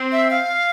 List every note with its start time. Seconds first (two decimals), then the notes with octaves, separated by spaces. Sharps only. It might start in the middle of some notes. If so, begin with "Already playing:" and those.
Already playing: C4
0.12 E5
0.31 F5